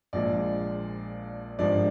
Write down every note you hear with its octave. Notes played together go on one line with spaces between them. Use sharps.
A#1 A#2 F3 G#3 D5
G#1 G2 F3 G#3 D5